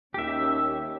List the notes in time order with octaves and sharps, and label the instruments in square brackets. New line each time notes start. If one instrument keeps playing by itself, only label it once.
[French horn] D#2 [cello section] C#4 [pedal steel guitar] G4 E5